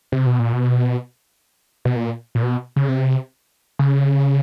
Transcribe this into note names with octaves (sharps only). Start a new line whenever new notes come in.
C3
B2
A#2
B2
B2
A#2
A#2
B2
C#3
C3
C#3